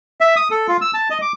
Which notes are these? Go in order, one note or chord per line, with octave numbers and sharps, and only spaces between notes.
E5
D#6
A4
F4
E6
A5
D#5
D6